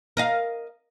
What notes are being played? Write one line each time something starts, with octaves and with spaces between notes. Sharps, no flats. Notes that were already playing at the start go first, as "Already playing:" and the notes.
A#4 D#5 F5